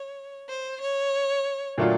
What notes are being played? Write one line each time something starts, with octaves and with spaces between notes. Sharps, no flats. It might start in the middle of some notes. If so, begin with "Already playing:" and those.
Already playing: C#5
C5
C#5
A#2 F#3 A3 D4 F4